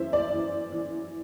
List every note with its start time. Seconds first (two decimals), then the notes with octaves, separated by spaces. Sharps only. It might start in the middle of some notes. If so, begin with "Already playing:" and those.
Already playing: F#2 E3 C5 E5
0.13 D5
0.32 E3
0.72 E3